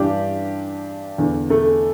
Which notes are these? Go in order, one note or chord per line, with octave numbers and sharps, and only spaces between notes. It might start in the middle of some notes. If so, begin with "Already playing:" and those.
Already playing: G2 E3 D4 G4
E2 D3
A3